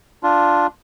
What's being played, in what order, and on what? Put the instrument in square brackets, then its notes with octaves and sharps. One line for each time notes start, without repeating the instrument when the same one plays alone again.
[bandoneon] D4 F4